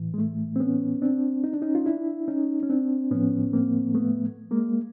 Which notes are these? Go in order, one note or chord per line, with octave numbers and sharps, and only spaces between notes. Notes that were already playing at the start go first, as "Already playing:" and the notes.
Already playing: A2 E3
G#3
A3
C4
B3 C#4
C4 D4
D#4
D4
C#4 D#4
F4
D4 E4
C#4 D#4
C#4
C4 D4
A2 F3 B3 C#4
A#3 C4
A3 B3
G#3 A#3